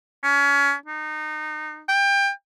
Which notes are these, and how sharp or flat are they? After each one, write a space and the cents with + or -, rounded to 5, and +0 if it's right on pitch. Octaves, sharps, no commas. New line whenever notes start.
C#4 +25
D#4 -25
G5 +25